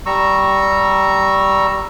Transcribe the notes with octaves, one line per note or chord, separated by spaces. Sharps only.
G3 A#5 C#6 E6